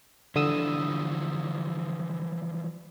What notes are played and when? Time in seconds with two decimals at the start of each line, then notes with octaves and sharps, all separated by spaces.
0.36 D3 E3 F3 G3 D#6 E6